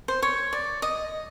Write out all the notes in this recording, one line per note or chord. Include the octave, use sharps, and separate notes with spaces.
C5
C#5
D5
D#5